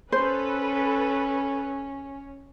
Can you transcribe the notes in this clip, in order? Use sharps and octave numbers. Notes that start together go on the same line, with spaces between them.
C#4 A4 B4 C5